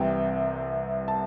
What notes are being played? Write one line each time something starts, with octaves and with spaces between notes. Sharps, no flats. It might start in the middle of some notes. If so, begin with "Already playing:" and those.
Already playing: C2 C3 E3 G5
A5